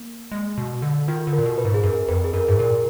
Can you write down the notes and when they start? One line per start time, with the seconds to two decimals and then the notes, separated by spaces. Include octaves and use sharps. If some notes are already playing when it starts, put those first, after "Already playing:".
Already playing: A#3
0.31 G#3
0.58 B2
0.82 D3
1.08 D#3 F4
1.27 D3
1.33 A#4
1.39 A#2
1.46 B2
1.58 B4
1.65 G#2
1.74 G#4
1.83 F#2 A#4
2.08 F2 B4
2.24 G#4
2.33 F#2 A#4
2.48 G#2 G#4
2.59 A#2 A#4